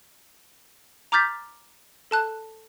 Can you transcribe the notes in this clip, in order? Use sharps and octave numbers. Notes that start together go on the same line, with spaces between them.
A#5 D6 F6 G6 A6 B6
A4 A5 F#6